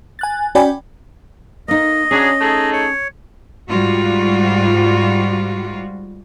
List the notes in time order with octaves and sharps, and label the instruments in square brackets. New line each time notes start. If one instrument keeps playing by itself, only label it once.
[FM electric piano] G#5 F#6 A6
C#4 F#4 D5 G5 G#5 B5
[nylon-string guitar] A#3 D#4 [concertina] D#5
[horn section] F#3 D4 G#4 [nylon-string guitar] C#4
[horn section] A3 D#4 G#4
[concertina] C#5
[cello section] G#2 G3 F4 F#4